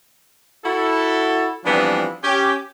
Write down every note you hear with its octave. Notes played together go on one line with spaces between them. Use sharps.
E4 F#4 A4
E3 F3 G3 B3 C4 D4
C#4 G4